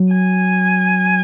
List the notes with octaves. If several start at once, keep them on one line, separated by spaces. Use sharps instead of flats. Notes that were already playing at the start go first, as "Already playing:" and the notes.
Already playing: F#3
G#5